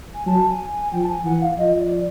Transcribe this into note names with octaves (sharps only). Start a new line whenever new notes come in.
G#5
F#3 A5
G#5
G#5
F3 G5
A5
G#5
E3 F#5
F5
F3 D#5
D#5
D5